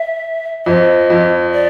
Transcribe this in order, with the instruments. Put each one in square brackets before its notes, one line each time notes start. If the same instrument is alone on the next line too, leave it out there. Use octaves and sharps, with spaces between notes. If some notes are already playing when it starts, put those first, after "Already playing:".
Already playing: [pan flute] E5
[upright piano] F2 [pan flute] D#5
[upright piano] F2
[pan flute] D5